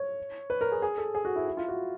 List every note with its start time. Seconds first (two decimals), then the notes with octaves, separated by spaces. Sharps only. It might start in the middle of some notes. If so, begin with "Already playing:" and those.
Already playing: C#5
0.50 B4
0.61 A#4
0.72 G#4
0.82 G#4
0.98 A4
1.15 G#4
1.25 F#4
1.36 E4
1.47 E4
1.57 F4
1.68 F#4